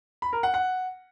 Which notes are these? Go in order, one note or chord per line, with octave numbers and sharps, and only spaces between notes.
B5
A#4
F#5
F#5